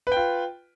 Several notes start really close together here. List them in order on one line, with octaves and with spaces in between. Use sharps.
B4 G5 F4